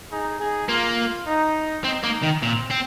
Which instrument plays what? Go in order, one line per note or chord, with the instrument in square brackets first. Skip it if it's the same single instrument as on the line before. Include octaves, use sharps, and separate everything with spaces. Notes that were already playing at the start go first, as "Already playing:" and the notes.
[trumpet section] D#4 G#4
D#4 G#4
[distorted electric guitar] A#3 [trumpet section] F4
[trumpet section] D#4
[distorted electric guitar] C4 [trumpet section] D#4
[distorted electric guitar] A#3
D#3
[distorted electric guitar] A#2 [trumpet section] C4
[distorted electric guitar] C4